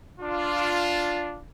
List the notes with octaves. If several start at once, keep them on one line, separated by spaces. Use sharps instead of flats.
D4 F4